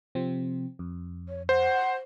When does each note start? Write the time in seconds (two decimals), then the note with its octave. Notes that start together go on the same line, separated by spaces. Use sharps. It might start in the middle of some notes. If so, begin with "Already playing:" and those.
0.15 C3 F3 C4
0.79 F2
1.29 C#5
1.49 C5 F#5